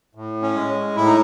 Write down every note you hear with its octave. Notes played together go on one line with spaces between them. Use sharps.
A2
C#4
G#3
A2 E4
D#4